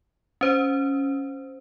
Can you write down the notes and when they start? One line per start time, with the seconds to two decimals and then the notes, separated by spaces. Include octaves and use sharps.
0.41 C#4 C5